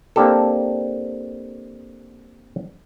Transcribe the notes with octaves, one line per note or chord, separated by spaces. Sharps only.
A#3 C4 D4 G4 A4